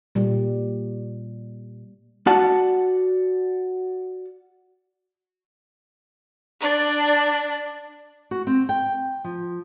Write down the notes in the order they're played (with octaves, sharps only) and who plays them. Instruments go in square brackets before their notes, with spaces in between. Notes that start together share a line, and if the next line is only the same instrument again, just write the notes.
[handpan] A#2 G3
[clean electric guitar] F#4 D5 F#5 A5
[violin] D4 D5
[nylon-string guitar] F#4
C4
G5
F3